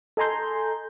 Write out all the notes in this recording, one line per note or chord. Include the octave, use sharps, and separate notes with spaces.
A4 D#5 G#5 A#5 C6 G6